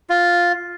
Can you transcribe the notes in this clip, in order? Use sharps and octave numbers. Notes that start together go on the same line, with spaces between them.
F4